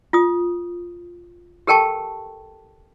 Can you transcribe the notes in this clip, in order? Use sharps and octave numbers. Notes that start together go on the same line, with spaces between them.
F4 D#6
G4 A4 A#4 G5 A5 C#6